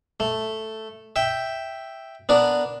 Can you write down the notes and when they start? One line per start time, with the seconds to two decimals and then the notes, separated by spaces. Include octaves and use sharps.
0.20 A3
1.16 E5 G5
2.29 B3 D4 A#4